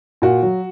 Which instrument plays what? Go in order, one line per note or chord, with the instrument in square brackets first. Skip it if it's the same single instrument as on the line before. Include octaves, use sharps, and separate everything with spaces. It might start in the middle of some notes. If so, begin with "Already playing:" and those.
[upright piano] A#2 F#4
F#3